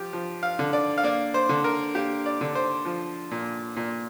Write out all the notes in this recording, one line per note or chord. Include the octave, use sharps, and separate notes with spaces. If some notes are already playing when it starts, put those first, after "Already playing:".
Already playing: F3 G4
F3
F5
D3
D5
F5
A#3 D5
C5
D3
A#4
A#3 G4
D5
D3
C5
F3
A#2
A#2